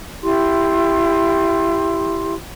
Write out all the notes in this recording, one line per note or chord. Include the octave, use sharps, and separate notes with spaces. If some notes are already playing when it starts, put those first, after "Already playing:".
E4 G4 C6